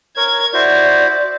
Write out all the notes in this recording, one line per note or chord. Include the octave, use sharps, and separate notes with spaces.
A#4 C#5 G#6
E4 F#4 C5 D5